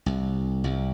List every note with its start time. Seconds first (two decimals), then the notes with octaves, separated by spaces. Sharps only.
0.06 C2
0.64 C2